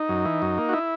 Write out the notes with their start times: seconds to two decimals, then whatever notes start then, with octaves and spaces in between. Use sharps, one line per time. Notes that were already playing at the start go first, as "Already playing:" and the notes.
Already playing: D#4
0.09 F#2
0.25 E3
0.42 F#2
0.58 A#3
0.69 F#4
0.73 E4